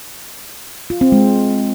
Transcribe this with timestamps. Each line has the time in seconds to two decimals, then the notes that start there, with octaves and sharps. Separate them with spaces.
0.90 F4
1.01 C4
1.12 G#3